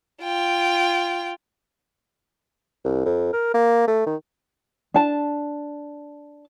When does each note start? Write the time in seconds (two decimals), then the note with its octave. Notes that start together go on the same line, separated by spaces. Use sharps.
0.23 F4 G5
2.85 C2
3.05 F2
3.33 A#4
3.54 A#3
3.87 A3
4.06 D#3
4.94 D4 A5